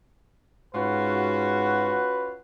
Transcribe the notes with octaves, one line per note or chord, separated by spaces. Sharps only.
G#2 C#4 F4 F#4 B4